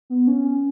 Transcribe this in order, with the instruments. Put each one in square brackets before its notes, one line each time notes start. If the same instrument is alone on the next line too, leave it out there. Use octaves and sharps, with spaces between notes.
[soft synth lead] B3
C#4
C#4